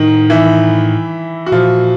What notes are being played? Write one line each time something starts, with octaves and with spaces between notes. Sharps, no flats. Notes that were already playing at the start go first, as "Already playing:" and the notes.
Already playing: A2 D#3 D#4
E3 E4
F#4
A#2 F3 F4